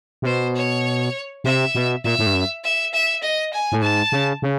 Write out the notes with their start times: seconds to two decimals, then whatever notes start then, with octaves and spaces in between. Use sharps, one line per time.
0.22 C3
0.26 B2 C5
0.56 C#5
1.44 C3 E5
1.75 B2
2.04 A#2 E5
2.19 A2
2.26 G2
2.34 F#2
2.64 E5
2.94 E5
3.23 D#5
3.53 G#5
3.72 A2
3.82 G#2 A5
4.12 C#3
4.42 C#3